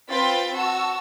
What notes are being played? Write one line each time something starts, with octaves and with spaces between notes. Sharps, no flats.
C4 F4 B4 G5 A6 B6
F#4 A5 C#6 E6